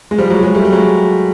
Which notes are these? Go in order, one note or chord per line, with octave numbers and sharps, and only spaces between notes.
G#3
F3 G3
F#3 G#3
F#3 G#3
G3 A3
G3
F#3 G#3